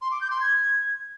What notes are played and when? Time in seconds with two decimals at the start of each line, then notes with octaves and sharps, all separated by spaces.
0.02 C6
0.11 D6
0.21 G6
0.31 C6
0.41 G#6